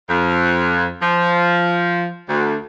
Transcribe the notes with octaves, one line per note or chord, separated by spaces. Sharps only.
F2
F3
D2